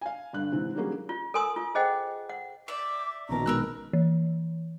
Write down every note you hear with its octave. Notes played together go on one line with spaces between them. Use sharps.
F5 G#5
G2 D3 F#6
G#2 C3 E3
D#3 F#3 G3 A#3 C#4 G#4
F4
A4 A#4 G#5 C6 D#6
F4
G#4 C5 D#5 F#5 G5
F#5
D5 E5 D6
A#1 B2 D#3 C#4 A5 A#5
G#3 B3 A#4 E6 F#6
E3